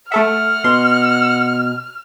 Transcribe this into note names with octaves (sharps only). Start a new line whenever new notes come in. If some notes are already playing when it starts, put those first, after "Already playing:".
A3 A4 E5 F#5 F6
B2 C6